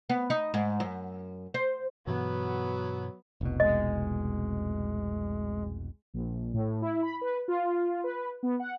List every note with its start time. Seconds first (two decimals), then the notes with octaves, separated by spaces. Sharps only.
0.09 B3
0.30 D#4
0.54 G#2
0.80 F#2
1.54 C5
2.07 G2 B2 E3 F#3 B3
3.41 F1 C2 B2
3.60 G#3 D#5
6.14 A#1
6.54 A2
6.82 E4
7.03 B5
7.21 B4
7.48 F4
8.04 B4
8.43 B3
8.60 F#5